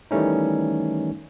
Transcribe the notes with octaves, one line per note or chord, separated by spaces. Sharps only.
D#3 E3 G3 A3 C#4 D#4